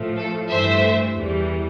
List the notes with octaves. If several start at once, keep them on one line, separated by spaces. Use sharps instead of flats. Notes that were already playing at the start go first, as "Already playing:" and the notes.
Already playing: A2 F3 A3
A4
G2 E3 A3 C5 E5
E2 E3 G3